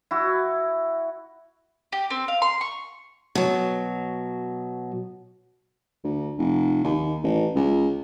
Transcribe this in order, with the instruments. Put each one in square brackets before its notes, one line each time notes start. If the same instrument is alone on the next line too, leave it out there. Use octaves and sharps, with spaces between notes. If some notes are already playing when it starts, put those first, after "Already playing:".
[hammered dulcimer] E4 F#4
[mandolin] G4
C4
F5
C6
C#6
[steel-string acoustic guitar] B2 F#3
[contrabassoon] D2
F1
D#2
A1
C#2